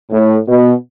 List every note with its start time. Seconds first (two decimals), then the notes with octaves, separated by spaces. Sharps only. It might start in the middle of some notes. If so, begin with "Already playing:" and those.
0.11 A2
0.47 B2